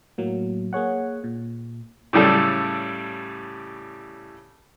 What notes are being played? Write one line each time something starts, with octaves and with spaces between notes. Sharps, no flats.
A2 F#3 A#3
A#3 G#4 C#5 F#5
A#2
A2 C#3 G3 A4